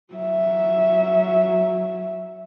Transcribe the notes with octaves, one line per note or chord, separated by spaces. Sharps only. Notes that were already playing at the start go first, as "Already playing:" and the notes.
F#3 E5